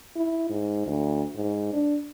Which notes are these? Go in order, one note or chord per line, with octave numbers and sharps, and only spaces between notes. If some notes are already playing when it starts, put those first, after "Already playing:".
E4
G#2
D2
G#2
D4